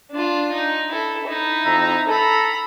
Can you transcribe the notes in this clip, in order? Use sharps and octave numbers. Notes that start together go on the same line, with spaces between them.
D4 F4
D#4
E4 A4
D#4 E4
F2 E5 A#5
A4 A#5 B5